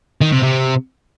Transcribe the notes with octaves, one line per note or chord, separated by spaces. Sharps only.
D#3
C3
C3